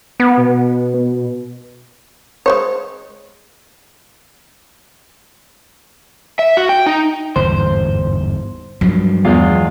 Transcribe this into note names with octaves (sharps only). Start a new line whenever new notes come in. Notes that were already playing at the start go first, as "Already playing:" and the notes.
B3
B2
G#3 C5 C#5
E5
F#4
G5
D#4
G1 E2 G#2 C5
G2 F3 F#3
E2 G#3 F4